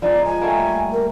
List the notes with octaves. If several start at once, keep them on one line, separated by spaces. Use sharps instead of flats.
F3 G#3 D#4 D5
G#5
G3 A3 A#3
A#4